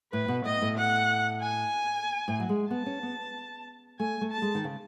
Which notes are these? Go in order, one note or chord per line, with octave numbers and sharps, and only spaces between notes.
A2 B4
B2
A2 D#5
A2
F#5
G#5
A2
F#3
G#3
B3 A5
C#4
B3
A3 G#5
A3
A5
G#3
D#3
C#3